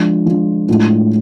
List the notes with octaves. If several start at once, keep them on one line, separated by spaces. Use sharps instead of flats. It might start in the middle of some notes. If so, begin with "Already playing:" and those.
Already playing: F3 G#3 D4 F4
F3 G#3 D4 F4
A2 G#3 D4 F4